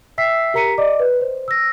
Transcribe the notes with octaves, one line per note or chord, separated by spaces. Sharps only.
E5 G5 E6 B6 C7
G4 A#4 A#5 B6 C#7 D#7
D5 D#5 D6
B4
C5
E6 A#6